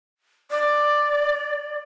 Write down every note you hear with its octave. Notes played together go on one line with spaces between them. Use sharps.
D5